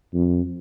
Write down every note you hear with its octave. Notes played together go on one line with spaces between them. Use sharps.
F2